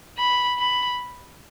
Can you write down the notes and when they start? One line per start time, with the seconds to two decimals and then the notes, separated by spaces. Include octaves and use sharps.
0.18 B5
0.58 B5